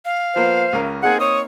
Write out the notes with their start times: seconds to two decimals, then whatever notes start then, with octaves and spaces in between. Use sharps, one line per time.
0.05 F5
0.36 F3 A#3 B3 C5
0.73 C#2 C#4 A#4
1.03 A#3 C4 D#4 G#4 F#5
1.20 C#5 D#6